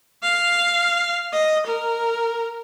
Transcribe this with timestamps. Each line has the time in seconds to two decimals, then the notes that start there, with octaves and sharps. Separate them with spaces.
0.23 F5
1.33 D#5
1.67 A#4